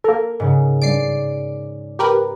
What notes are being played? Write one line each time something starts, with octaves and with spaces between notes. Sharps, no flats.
A#3 A4 A#4
G#2 C#3
G2 D5 C7 D7
G4 A#4 B4